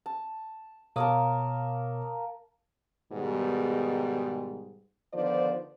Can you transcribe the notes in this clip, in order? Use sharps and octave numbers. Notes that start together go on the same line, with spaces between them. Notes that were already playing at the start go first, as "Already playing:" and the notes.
A5
B2 A#3 A#4 C#5 A5 D#6
G#2 B2 D#3 G3 B3 G#4
D3 D#3 F3 B3 C5 D5